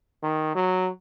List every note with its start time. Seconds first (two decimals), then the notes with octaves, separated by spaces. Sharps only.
0.23 D#3
0.55 F#3